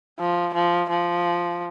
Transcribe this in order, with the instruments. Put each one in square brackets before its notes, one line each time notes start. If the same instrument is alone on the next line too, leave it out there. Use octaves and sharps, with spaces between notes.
[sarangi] F3
F3
F3